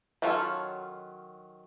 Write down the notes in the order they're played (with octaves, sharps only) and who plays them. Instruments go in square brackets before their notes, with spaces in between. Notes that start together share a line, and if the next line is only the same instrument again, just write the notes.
[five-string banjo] D#3 F#3 C#4 F4 A4